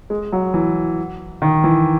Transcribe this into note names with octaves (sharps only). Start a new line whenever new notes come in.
G#3
F#3
E3
D#3
E3